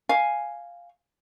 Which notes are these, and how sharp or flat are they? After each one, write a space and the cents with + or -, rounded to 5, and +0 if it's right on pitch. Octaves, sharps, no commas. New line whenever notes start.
F5 +0 G#5 +0